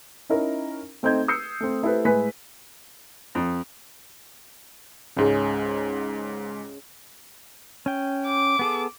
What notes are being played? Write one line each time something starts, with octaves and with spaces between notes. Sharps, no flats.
C#4 D#4 E4 A#4
A3 C4 D#4 G6 G#6
D#6 E6 G6 C7 C#7
A3 C4
A3 E4 G4 A4 B4 C5
A2 G#3 B4 G#5 B6
F2
C#2 G#2 G#3 C#4 G#4
C#4 G5
D6
B3 G#4 A4